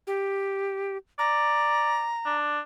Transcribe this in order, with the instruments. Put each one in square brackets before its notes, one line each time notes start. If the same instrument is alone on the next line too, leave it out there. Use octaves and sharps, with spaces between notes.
[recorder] G4
[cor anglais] D5 [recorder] A#5
[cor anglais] D4